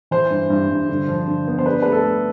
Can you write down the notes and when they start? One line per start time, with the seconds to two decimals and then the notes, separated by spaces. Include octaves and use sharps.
0.11 E3 C5
0.31 G2
0.50 G2
0.69 G2
0.89 D3
1.08 F3
1.28 D3
1.47 B3
1.58 C5
1.66 D4 B4
1.82 A3 B4
1.92 A4
2.05 A3